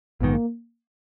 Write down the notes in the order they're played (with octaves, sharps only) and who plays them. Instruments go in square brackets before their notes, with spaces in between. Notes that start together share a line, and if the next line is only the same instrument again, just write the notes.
[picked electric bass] A#1 G#2 D#3 [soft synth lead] B3
[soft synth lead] A#3